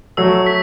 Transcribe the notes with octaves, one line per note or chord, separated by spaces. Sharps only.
F#3 A3 E6
B6